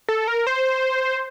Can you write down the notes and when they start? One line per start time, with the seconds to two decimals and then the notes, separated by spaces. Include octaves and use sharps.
0.09 A4
0.28 A#4
0.47 C5